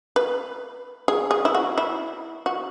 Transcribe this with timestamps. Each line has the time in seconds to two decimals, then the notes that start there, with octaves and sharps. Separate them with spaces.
0.16 B4
1.08 G#4
1.31 G#4
1.45 E4
1.55 F#4
1.78 E4
2.46 F#4